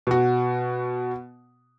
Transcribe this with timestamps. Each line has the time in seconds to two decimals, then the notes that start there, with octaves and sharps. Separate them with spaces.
0.07 B2 F#4